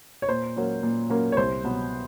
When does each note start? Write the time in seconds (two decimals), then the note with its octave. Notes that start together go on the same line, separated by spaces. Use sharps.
0.22 C#5
0.28 A#2 C5
0.56 F#3 A#3 C#4
0.83 A#2
1.10 F#3 A#3 C#4
1.32 C#5
1.37 C2 C5
1.64 B2 F#3 B3